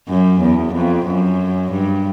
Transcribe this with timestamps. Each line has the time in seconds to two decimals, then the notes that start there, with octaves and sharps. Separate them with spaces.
0.09 F#2
0.41 E2
0.74 F2
1.07 F#2
1.72 G2